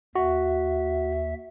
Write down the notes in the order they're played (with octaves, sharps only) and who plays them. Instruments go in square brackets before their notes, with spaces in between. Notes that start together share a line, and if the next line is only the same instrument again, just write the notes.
[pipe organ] D#2 E5 [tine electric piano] F#4